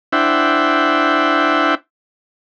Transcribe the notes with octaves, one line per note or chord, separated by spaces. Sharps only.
D4 E4 C5 E5 F#5 G5